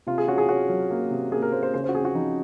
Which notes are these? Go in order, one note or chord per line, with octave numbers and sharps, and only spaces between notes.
C3 F4
G#4
C#4 F#4
G#4
C#4 F#4
F#3
A#3
C3
A#3 G#4
A#4
A#3 C5
C5
C#3 C5
F#4 C5
C4 G#4
F#4
F3 D#4